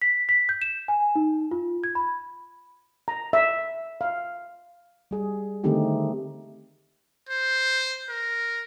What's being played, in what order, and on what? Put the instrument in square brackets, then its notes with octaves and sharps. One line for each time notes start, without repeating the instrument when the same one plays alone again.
[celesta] B6
B6
G6
E7
G#5
D#4
F4
G#6
B5
[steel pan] A#5
E5
F5
[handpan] G3 G#4
D3 D#3 A3 C4 D#4 G4
[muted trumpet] C5
A#4